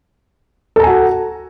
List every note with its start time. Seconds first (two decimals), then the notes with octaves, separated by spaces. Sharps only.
0.76 A4
0.80 A#5
0.83 G#5
0.87 F#4